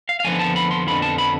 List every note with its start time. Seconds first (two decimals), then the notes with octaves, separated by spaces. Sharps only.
0.09 F5
0.20 F5
0.24 F2 D3 F3 B3 G#5
0.39 A5
0.56 B5
0.71 C6
0.87 F2 D3 F3 B3 B5
1.02 A5
1.18 B5